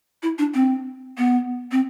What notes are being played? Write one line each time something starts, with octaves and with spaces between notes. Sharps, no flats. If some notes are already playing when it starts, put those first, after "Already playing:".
E4
D4
C4
B3
C4